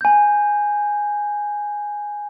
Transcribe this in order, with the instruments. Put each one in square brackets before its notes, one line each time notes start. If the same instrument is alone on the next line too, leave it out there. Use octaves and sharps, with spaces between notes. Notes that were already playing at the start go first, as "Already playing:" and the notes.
[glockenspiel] G#5 G6